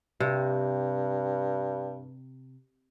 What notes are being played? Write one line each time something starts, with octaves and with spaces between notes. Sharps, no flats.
G2 C3